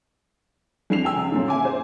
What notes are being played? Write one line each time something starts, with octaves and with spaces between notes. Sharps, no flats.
F2 D4 C7 F7
G5 G#5 E6
C#2
F#2 A#2 D3
E5 G#5 D6
C5